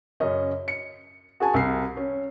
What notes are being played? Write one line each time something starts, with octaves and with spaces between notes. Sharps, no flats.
F#2 C#3 C#4 D#5
C#7
F#4 G#4 G#5 A5
C2 C7
C#4